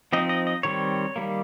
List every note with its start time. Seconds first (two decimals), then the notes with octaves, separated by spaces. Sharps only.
0.13 F3 C4 D#4 D#5
0.29 D#5
0.47 D#5
0.63 D#3 G3 C4 C#5
1.16 D#3 G3 A#3